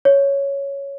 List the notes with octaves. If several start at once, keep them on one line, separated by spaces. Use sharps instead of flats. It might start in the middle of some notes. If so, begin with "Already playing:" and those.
C#5